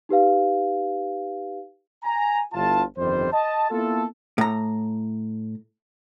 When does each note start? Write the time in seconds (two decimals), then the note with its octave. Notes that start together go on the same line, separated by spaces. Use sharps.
0.09 D#4 G4 B4 F5
2.04 G#5 A#5
2.53 G1 E4 F4 A5
2.98 G1 F2 D#3 G3 C5
3.32 D#5 A5
3.71 A#3 B3 E4 F4 A4
4.38 A2 A#5